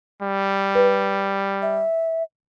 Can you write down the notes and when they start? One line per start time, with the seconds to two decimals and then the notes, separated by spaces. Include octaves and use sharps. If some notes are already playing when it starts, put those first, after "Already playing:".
0.22 G3
0.75 B4
1.62 E5